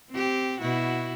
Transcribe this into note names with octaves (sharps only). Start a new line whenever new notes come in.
C4 G4
B2 E4 F#4